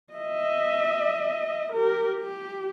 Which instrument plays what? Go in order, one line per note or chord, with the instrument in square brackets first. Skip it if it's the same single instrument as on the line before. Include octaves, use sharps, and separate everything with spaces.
[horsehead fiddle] D#5 E5
G4 A#4
G4